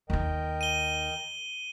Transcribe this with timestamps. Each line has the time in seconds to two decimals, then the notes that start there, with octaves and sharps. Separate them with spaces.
0.10 D#2 D#3 A#4 D#5 G5
0.61 D#7 G7